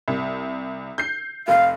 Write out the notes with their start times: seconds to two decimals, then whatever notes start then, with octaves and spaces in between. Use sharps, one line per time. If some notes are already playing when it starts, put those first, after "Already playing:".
0.08 C2
0.98 G6 C7
1.48 F1 F5